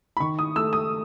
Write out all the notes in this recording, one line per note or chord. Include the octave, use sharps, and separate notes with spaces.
B5
D#3 C#6
D#6
A3 E6
D#6